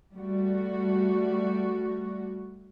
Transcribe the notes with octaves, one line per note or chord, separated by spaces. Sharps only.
G3 A3 F#4